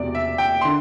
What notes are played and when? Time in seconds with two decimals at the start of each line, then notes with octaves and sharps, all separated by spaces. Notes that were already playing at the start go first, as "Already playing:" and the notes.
Already playing: E1 E2 C3 D5
0.15 E5
0.38 G5
0.61 D3 C6